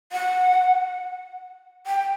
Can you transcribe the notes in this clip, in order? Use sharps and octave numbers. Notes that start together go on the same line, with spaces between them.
F#5
G5